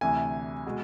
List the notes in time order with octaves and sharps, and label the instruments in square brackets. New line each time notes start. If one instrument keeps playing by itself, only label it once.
[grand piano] D2 C3 E3 G#5
B2 G#3